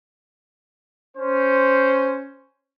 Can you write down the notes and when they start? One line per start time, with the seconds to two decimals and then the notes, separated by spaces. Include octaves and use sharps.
1.17 C#4 C5